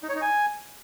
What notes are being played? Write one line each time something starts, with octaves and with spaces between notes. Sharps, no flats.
D#4
C#5
D#4
G#5